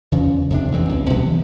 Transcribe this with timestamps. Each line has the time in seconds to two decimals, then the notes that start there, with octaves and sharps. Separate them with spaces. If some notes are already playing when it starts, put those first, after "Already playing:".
0.12 E2 C#3 F3
0.50 F2 C3 D4
0.72 A1 E2 C4
0.89 C#2
1.10 B2 F#3 G3 B3
1.26 E3